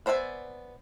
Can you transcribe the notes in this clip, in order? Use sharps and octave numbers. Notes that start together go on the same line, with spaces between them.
B3 C5 D5 E5 G#5